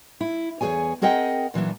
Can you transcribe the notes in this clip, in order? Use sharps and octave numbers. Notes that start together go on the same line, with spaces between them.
E4
E2 G2 G#4 C#5 G#5
C4 G#4 A#4 D#5 F#5 G5
A#2 E3 F#3 D4